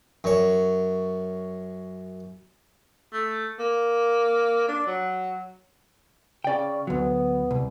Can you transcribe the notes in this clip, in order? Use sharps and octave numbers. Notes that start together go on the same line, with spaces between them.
F#2 C#5
A3
A#3
D4
F#3
C#3 D5 G5
D2 F#3 B3
C2